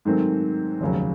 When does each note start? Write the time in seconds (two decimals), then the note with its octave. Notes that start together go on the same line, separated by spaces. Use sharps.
0.05 G#2 D#3 F#3 A3 C4
0.81 F1 D#2 C#3 F#3